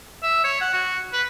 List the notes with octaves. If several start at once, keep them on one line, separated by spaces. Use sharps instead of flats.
E5
C#5
F#5
F#4
B4